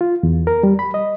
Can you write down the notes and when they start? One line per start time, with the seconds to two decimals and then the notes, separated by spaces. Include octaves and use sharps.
0.01 F4
0.23 E2
0.47 A#4
0.63 G3
0.79 B5
0.94 D#5